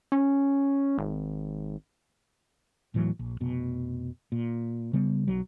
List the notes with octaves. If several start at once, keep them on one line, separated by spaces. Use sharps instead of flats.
C#4
G#1
D1 A2 E3 F#3
A#1
F1 B2
A#2
C#3 G3 B3
B1 F#3